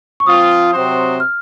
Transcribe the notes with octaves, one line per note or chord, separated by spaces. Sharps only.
C#6
F3 C4 F4 D#6
C3 F#3 C4 F#4 C5
F6